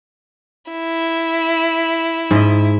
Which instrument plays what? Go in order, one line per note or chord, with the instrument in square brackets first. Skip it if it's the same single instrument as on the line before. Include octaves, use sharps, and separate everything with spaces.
[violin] E4
[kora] G#2 D#5